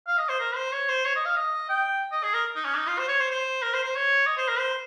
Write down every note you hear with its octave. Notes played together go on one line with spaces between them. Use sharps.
F5
D#5
C5
A#4
C5
C#5
C5
C#5
D#5
F5
D#5
G5
D#5
G#4
A#4
D#4
C#4
D#4
F4
C5
C#5
C5
C5
A#4
C5
C5
C#5
D#5
C5
A#4
C5